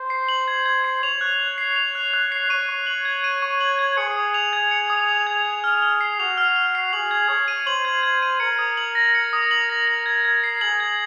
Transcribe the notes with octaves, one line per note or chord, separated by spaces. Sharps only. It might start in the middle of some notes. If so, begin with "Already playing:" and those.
Already playing: C5
C7
F#7
G#6
G#6
C7
C#5 F7
F#6
F#6
C7
F7
F#6
F#6
C7
C#5 D#7
C#6
F#7
G#6
D#7
C#6
F#7
G#6
G#4 C#7
D#6
F7
G#6
C#7
D#6
F7
G#6
F7
F6
F6
C7
F#4 F7
F6
F6
C7
G#4 F#7
G#6
C#5 G#6
D#7
C5 F#7
G#6
G#6
D#7
A#4 C#7
D#6
F#7
A#6
C#7
D#6
F#7
A#6
F#7
G#6
G#6
C7
G#4 F#7
G#6